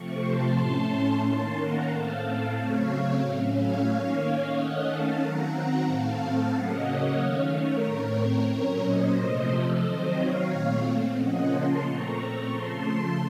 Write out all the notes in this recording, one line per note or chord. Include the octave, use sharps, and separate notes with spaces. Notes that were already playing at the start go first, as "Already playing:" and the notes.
Already playing: C3 F3 A3 C4 C#6
A5 C6
A2 A3 C#4
D#3 A#3 C#4 A5 C6
F#5 A#5
A2 A3 C4 F5 A5
F5 A5
C#3 F#3 A3 C4 C#5 F5
A2 F#3 A3 C#4
C#5 F5
D#3 A#3 C#4
D#3 A3 C#4 D#5 F#5
F5 A5
D#3 F#3 C4 F#5 A#5
F#5 A#5
A2 A3 C4 F5 A5
C#3 F#3 A#3 C#4 D#5 F#5
D#3 A3 C#4 C#5 F5
A#4 C#5
A2 A3 C4
A#2 F#3 A#3 C#4 A#4 C#5
C5 D#5
C3 F3 A3 C5 D#5
A4
D#3 F#3 C4 C5 D#5
C#5 F5
A#2 A3 C4
C#3 F3 A#3 C#4 D#5 F#5
A5 C6
A#2 A3 C4 A#5 C#6
C#3 F3 A3 A5 C6